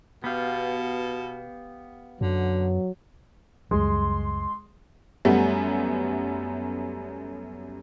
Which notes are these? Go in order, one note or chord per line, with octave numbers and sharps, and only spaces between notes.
B2 B3 G4 F5
F#2 D3 F#3
C#2 F#2 G3 G#3 C6
F#2 G3 A3 B3